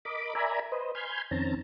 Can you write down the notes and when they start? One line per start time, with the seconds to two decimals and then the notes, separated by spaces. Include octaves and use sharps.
0.05 A#4 D#5 B5 D6
0.35 A#4 D5 E5 G#5 A#5 B5
0.72 B4 C5 D#5
0.95 G#5 B5 C6 F6 G6 G#6
1.31 F2 D#3 C4 C#4 A5 A#5